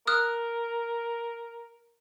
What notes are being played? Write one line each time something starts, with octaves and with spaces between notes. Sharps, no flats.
A#4 D#6 F6 F#6